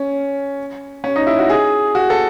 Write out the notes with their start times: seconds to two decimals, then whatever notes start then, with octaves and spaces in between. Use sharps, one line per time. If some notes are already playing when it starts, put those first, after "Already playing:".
Already playing: C#4
1.04 C#4
1.16 D#4
1.27 E4
1.39 F#4
1.49 G#4
1.95 F#4
2.10 A4